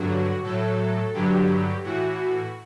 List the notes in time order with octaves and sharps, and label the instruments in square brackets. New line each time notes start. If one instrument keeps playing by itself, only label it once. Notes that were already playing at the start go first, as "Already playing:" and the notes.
Already playing: [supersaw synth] G2 D3 F#3 F#4
A2 F#3 A4
G2 D3 F#3 G4
A2 E3 F#4